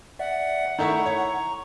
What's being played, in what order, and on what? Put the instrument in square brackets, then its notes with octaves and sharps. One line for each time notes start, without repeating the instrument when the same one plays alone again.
[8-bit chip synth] D5 E5 [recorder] F#5
[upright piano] D#3 A3 E4 [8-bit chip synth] A#5 C#6
[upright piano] C#5